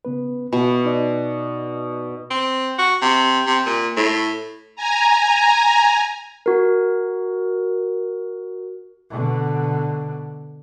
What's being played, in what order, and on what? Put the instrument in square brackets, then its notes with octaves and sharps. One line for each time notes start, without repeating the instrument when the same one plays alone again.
[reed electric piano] C#3 B3 B4
[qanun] B2 [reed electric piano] B5
[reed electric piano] D#4 D5 D#5
[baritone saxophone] C4
F#4
C3
C3
A#2
A2
[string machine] G#5 A#5
[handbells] F#4 A#4
[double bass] B2 D3